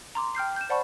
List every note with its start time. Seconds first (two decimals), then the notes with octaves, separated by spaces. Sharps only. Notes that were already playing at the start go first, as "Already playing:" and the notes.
0.15 A#5 C6 D6
0.35 G5 F6 G6 C7
0.56 G6 E7
0.69 C5 D5 F#5 A5 B5 C#6